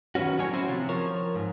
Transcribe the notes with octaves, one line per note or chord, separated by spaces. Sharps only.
D#3 F#3 B3 C#4 F#4
A2 F#3 C#4 D4 C#5 G#5
C4 C#4 E4 F#4 C5
C3 F3 F4
F3 A#4 C#5
G#2